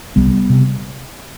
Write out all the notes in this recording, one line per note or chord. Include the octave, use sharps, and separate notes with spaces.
C2 G3 B3
C3